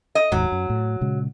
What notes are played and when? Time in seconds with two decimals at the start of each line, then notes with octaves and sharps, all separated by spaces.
0.15 D#5
0.32 E1 D#2 G#2 F#3
0.52 F#2
0.70 A2
1.01 A#2 C#3 G#3